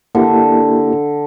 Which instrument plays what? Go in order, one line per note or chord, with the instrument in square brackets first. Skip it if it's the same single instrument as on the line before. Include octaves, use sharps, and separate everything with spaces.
[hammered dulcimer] D3 [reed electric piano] A#3 E4 G4